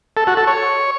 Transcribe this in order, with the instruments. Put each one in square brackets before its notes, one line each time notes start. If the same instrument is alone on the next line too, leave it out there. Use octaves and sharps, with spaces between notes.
[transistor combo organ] A4
F#4
A4
C#5